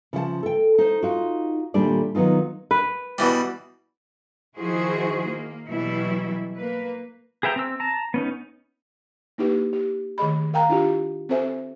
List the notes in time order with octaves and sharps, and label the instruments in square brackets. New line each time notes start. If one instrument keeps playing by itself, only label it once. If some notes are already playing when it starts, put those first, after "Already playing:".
[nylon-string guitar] C#3 F3 F#5 A5
A4 G5
D#4 C5
D#4 F4 F#4
D#2 A#2 G3 A3 D4 D5
D#3 F#3 B3 D#4 F4
[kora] B4
[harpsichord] B2 E3 G3
[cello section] D#3 F3 E4 F#4 G#4 C5
A#3
B2 E3 F#3 G3 E4
A#3 B4
[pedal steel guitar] G#4 B4 E5 G5 A#5
C4 E6
A5 A#5
B3 C#4 D#4
[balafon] A#3 D#4 E4 G4 B4
G4
D#3 A3 G#4 D#5 B5
A#4 F5 G5 A#5
D4 E4 F4 G4
C4 F#4 A4 C5 E5 G#5